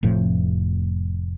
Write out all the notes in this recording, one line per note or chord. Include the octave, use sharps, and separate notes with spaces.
F1 F2 A2 F3